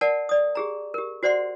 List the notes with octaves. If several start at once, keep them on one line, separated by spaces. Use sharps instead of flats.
A#4 D5 F#5 A5
D5 D#6
G4 G#4 A#5
G4 A#4
F#4 C5 D5 F#5 C6